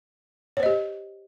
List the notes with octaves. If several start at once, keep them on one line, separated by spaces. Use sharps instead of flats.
G4 C5 C#5 D#5